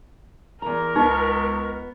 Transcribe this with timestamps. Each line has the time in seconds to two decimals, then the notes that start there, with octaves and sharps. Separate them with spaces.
0.62 E2 A#4 A#5
0.96 C#2 B3 D#4 D#5 C#6